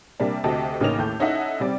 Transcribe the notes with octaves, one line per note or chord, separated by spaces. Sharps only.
C3 G3 A#3 D4
D2 C3 G4 A4 D#5 A5
A1 C#3 A#3 C#4 D#4 F7
D#2 A2 A4 G6
C#4 D#4 E4 A4 E5 F#5
C3 G3 C4 D5